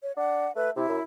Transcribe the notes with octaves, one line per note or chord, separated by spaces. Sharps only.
C#5
D4 F#5
A3 B4
C3 E4
F#2